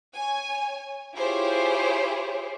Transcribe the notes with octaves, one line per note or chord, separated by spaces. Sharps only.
C#5 G#5
E4 F4 G4 G#4 C5 C#5